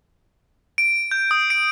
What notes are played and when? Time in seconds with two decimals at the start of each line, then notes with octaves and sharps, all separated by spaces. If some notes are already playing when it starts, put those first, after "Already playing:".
0.78 D7
1.11 G6
1.31 D#6
1.50 D7